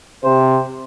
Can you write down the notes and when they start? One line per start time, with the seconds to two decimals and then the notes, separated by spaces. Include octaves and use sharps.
0.24 C3 C5